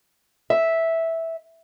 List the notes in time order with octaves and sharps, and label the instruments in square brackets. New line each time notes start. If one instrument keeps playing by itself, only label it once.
[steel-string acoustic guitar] E5